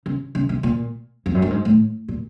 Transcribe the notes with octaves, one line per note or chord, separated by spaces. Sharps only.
C#3
C#3
C3
A#2
F2
F#2
G2
G#2
A2
A#2